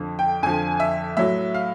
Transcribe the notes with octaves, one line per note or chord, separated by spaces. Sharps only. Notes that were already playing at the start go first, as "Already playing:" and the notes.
Already playing: F2 D3 F3
G5
F2 D3 F3 G#5
E5
A2 F#3 E5
F5